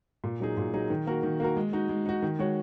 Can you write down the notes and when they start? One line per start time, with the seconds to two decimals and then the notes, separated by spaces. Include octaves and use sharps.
0.24 A#2
0.40 F#3 D#4 G#4
0.57 A#2
0.74 F#3 D#4 G#4
0.90 D#3
1.07 A#3 F#4 A#4
1.23 D#3
1.40 A#3 F#4 A#4
1.57 G#3
1.73 D#4 F#4
1.89 G#3
2.06 D#4 F#4
2.22 D#3
2.39 G#3 F#4 C#5